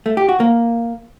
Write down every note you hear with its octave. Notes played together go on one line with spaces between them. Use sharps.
A3
G4
F#4
A#3